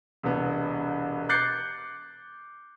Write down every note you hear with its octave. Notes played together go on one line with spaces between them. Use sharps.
E1 C2 B3
D6 F#6 G6 A6 C7 C#7